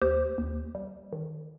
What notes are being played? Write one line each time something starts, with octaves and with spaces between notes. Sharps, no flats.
D#2 G4 C5
D#2
G3
D#3